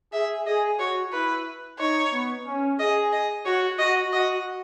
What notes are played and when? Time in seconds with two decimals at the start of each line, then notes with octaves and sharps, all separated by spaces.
0.13 G#4 E5
0.46 G#4 D#5
0.79 F#4 C#5
1.12 E4 B4
1.79 D#4 C#5
2.12 B3
2.46 C#4
2.79 G#4 D#5
3.12 D#5
3.45 F#4 C#5
3.79 F#4 D#5
4.13 F#4 D#5